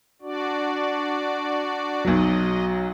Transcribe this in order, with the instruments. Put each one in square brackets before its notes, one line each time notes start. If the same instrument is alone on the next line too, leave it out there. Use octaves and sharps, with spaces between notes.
[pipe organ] D4 F#4 D5
[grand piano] B1 F#3 [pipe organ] D#5